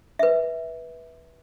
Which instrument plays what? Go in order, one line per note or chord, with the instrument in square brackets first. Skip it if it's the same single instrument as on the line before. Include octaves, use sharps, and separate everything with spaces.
[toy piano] B4 E5